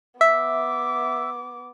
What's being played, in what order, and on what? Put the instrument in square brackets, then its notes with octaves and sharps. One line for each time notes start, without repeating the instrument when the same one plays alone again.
[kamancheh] B3 D6 [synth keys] E5